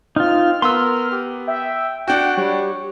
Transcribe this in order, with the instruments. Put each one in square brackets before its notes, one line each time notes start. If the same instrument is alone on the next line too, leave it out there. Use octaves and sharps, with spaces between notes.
[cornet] C4 [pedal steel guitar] D#4 F4 [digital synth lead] F6
[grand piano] B3 [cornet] A#4 [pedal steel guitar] C6 E6
[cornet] G4
[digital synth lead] E5 [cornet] G5
[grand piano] D4 F#4 [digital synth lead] F#5 [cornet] G5
[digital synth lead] G3 [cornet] C#5